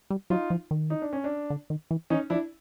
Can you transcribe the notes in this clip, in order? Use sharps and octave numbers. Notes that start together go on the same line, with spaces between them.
G3
F#3 D#4 F4
F3
D#3
D#4
D4
C#4
D4
D3
D#3
E3
E3 C#4 D#4
F3 D4 E4